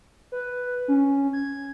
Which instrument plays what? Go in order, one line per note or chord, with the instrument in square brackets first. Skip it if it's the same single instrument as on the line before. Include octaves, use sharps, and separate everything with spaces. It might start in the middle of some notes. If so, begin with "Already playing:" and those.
[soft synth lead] B4
C#4
G#6